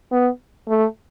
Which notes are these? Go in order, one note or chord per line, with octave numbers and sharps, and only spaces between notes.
B3
A3